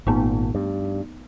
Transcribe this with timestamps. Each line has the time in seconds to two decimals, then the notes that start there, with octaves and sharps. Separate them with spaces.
0.07 G#1 A#2 A3 B3 D#4
0.55 G2